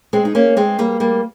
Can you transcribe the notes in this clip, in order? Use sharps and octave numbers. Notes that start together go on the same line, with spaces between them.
G#3 C4
D#4
A#3 C#4
G#3 C4
G3 A#3
G3 A#3